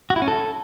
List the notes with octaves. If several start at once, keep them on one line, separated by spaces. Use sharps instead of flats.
F#4
E4
C#4
A4